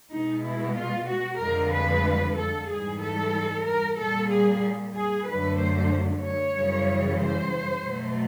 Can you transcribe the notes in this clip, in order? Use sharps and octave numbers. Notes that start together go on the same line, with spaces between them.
B2 G#3 D#4
E4
F4
F#4
F2 D3 F3 G#3 A#4
B4
A4
G#2 E3 G3 G#4
A4
A#4
A#2 G3 A4
G#4
G#4
F#2 D3 F#3 A3 B4
C5
C#5
F#2 C#3 E3 G3
C5
B2 F#3 A3